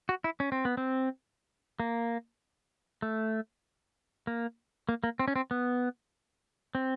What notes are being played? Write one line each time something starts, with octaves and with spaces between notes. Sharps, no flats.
F#4
E4
C#4
C4
B3
C4
A#3
A3
A#3
A#3
A#3
C4
C#4
C4
B3
C4